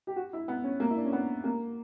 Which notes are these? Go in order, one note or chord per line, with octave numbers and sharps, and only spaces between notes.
G4
F#4
E4
B3
C#4
A#3
E4
D4
C#4
B3
A#3